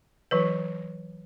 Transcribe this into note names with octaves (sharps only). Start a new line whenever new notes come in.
E3 F#3 B4